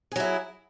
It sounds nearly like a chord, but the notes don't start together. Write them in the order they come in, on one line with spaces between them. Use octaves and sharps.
G#4 F#3 E4